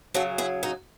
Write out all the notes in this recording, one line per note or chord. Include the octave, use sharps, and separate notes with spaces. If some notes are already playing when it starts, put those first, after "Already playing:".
F#2 C#3 F#3 F#4 A4
E4 G#4
D#4 F#4